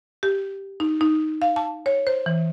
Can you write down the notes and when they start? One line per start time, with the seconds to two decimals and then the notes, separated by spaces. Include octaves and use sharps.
0.23 G4
0.80 D#4
1.01 D#4
1.42 F5
1.56 A5
1.86 C#5
2.07 C5
2.26 E3